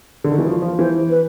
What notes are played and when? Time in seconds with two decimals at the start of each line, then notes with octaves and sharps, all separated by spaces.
0.24 D3
0.32 D#3
0.39 E3
0.46 F3 F#4
0.62 F3
0.79 E3 C5
1.10 B4